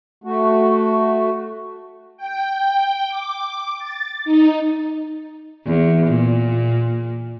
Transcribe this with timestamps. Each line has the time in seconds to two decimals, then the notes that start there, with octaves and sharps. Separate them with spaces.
0.24 A3 F#4
2.17 G5
3.09 D6
3.79 A6
4.25 D#4
5.66 E2
6.07 A#2